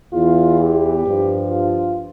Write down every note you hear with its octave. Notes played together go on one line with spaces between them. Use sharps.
E2 E3 F4
G4
G2 F3
F4